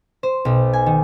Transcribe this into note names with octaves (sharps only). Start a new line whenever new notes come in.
C5
B1
G#5
D#3